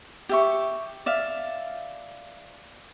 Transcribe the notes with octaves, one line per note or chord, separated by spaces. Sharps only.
G4 E5 C#6
D5 E5 F5